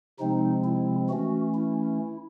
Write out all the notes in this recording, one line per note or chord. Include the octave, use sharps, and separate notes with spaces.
C3 F3 G#3 C4 D#4
E4
E3 A3 C#4 F#4
E4